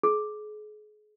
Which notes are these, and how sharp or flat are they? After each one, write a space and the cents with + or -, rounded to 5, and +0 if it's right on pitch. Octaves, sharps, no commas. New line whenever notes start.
G#4 +35